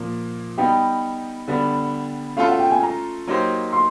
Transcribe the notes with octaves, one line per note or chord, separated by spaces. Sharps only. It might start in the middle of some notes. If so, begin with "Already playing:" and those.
Already playing: A#2 F3 A#3
G3 B3 D#4 G5
D3 G3 B3 D4
A3 C#4 F4 A4 F5
F#5
G5
G#5
A#5
F#3 A#3 D#4 G4 C5
C6